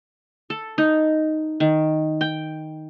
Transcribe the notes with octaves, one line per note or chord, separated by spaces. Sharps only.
A4
D#4
D#3
G5